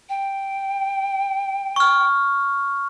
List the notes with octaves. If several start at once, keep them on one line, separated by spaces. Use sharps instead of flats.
G5
C#6 F6